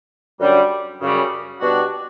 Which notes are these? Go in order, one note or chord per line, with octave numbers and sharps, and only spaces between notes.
F#2 D3 G3
F#2 C#3 G3
B2 G3 D4 F#4